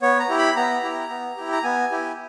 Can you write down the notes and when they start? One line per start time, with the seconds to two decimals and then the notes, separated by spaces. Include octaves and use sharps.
0.02 B3 C#5
0.20 A#5
0.29 E4 G4
0.38 B5
0.56 B3 A#5
0.83 E4 G4
1.10 B3
1.37 E4 G4
1.52 A#5
1.64 B3 G#5
1.91 E4 G4